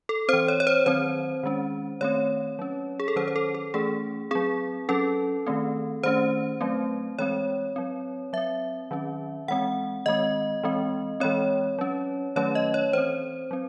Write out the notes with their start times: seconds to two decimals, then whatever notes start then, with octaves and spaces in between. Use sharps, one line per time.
0.09 A4
0.28 E3 C4 C5
0.48 C#5
0.60 C#5
0.67 C5
0.86 D#3 F#3 C4 C5
1.43 D#3 G#3 C#4
2.01 D#3 A3 C4 C#5
2.59 F#3 C#4
3.00 G#4
3.08 A4
3.16 D#3 F#3 C#4 C5
3.28 C5
3.36 A4
3.54 A4
3.74 E3 A3 C#4 G#4
4.31 F#3 C4 G#4
4.89 F#3 C#4 A4
5.47 D#3 A3 C4
6.03 D#3 A3 C#4 C5
6.61 F#3 A3 C4
7.18 E3 G#3 C4 C#5
7.76 F#3 C4
8.33 F#3 C4 E5
8.91 D#3 F#3 C#4
9.48 E3 G#3 C4 F#5
10.06 D#3 G#3 C4 D#5
10.63 E3 G#3 C4
11.20 E3 G#3 C4 C#5
11.78 F#3 C#4
12.36 D#3 F#3 A3 C#4 C#5
12.55 D#5
12.74 C#5
12.93 E3 C4 C5
13.51 F#3 C4